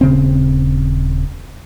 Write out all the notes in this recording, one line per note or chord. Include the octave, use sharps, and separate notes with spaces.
D#1 C#3 C4